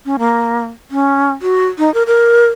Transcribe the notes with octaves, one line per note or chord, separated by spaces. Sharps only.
C#4
A#3
C#4
F#4
D#4
A#4
A#4